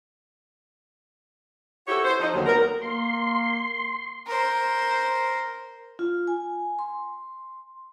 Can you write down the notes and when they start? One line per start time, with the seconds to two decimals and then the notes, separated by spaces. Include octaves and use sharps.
1.88 E4 F#4 G4 A4 C5 C#5
2.05 C5
2.20 F3 D#4
2.34 D#2 D3 F#3
2.46 B3 A#4
2.81 A#3 C6
4.26 A#4 C5
5.99 F4
6.28 G#5
6.79 C6